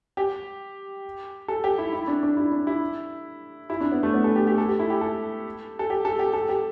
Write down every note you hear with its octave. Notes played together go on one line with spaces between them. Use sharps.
G4
A4
G4
E4
E4
D4
D4
E4
D4
E4
E4
D4
B3
A3
B3
A4
G4
G4
A4
G4
E4
G4
A4
A4
G4
A4
G4
A4
G4